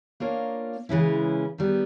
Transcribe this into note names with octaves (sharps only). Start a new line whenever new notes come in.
A#3 D4 F4 A#4 C#5
C#3 E3 G#3 C#4 E4
D#3 G3 B3